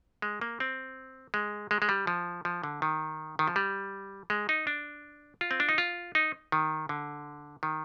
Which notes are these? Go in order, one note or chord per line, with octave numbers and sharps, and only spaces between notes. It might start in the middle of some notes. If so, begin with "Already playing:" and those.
G#3
A#3
C4
G#3
G#3
G#3
G3
F3
F3
D3
D#3
D#3
F3
G3
G#3
D#4
D4
F4
C4
D4
D#4
F4
D#4
D#3
D3
D#3